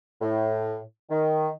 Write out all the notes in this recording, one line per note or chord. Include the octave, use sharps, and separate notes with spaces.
A2
D#3